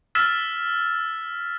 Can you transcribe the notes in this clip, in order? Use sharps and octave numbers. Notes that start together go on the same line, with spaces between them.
E6 F6 A6 B6 E7